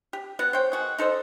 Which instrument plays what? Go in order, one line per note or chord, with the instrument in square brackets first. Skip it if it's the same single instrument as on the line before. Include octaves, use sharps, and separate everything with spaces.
[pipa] G4
B3 F#4 F#5
C5 C#5 G5
D#3 F#4 G#4
D#4 A4 C5 D#5